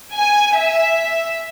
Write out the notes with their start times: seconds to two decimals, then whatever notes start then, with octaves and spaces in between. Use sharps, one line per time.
0.14 G#5
0.56 E5